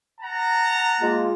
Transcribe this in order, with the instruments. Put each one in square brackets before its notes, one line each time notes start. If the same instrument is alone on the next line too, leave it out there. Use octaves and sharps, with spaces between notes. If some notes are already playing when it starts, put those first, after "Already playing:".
[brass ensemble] F#5 A5 A#5
[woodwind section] G#3 A#3 F4